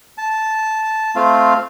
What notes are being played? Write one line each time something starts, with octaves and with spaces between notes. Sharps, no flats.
A5
A3 C4 F4 F5